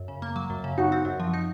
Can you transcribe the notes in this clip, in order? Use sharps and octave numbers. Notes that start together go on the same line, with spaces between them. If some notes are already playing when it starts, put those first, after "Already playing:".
Already playing: F#2
C#3
A#3
F#3
F#2
C#3
D#4 F#4
C4
F#2
F3
D#4